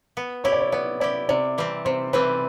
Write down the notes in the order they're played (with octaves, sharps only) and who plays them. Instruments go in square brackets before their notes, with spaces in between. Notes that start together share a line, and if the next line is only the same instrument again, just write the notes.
[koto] B3
[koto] E4 G4 [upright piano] C#5
[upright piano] D5
C#5
[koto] B3 [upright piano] D5
[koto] E4 G4 [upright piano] D5
[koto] C3 [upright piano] D5
[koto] E3 G3 C4
[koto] C3 [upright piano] C5
[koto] E3 G3 C4 [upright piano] B4